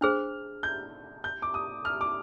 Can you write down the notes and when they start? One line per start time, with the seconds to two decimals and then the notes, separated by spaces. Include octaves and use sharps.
0.01 D4 G#4 C5 F6
0.63 G6
1.24 G6
1.42 D6
1.54 D#6
1.85 F6
2.01 D6